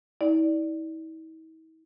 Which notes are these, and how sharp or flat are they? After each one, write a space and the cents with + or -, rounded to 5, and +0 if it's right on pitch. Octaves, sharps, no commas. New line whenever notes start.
E4 -45 D5 +0